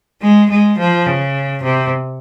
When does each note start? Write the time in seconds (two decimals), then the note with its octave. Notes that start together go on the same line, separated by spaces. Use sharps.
0.22 G#3
0.50 G#3
0.78 F3
1.06 C#3
1.63 C3